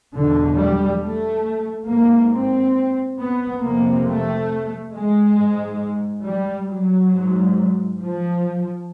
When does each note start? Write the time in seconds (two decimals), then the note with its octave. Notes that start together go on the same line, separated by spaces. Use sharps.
0.13 E2 B2 D3
0.57 G3
1.01 A3
1.88 G#2 A#3
2.32 C4
3.19 B3
3.62 F2 C3 A#3
4.07 A3
4.94 G#3
5.37 G#2
6.25 G3
6.68 F#3
7.11 G#2
8.00 F3